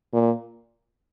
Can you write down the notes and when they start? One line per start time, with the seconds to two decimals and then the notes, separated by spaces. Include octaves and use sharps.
0.13 A#2